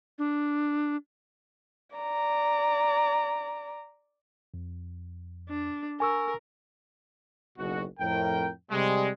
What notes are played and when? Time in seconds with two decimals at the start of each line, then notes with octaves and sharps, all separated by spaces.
0.18 D4
1.97 D5 A#5
4.54 F2
5.49 D4
6.00 A#4 G#5 C#6 E6
7.59 F#1 B1 B2 F#4
8.00 F2 A2 A#4 G5
8.71 C3 G3 G#3